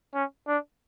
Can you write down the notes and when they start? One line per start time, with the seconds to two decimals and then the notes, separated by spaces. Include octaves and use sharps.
0.14 C#4
0.48 D4